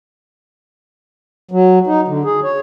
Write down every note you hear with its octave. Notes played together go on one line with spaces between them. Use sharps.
F#3
D#4
D3
G#4
C#5